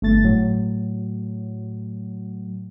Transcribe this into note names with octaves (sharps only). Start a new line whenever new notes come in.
G1 A3 A6
A2 F#3